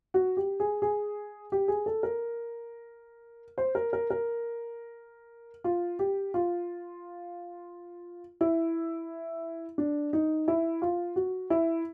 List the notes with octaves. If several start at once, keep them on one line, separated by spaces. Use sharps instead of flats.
F#4
G4
G#4
G#4
G4
G#4
A4
A#4
C5
A#4
A#4
A#4
F4
G4
F4
E4
D4
D#4
E4
F4
F#4
E4